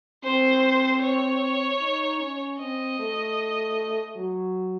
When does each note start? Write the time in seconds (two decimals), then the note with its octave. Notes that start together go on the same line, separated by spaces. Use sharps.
0.23 C4 C5
1.02 C#5
1.81 D#4
2.20 C#4
2.59 C4 D#5
2.99 A3
4.16 F#3